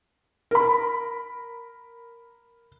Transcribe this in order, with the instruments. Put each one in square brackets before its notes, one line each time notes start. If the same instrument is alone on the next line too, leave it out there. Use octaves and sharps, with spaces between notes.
[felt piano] A#4 B5